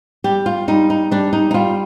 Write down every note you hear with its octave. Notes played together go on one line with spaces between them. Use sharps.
G3 G4
F4
G3 D#4
D#4
G3 D4
D#4
D#4
G3 F4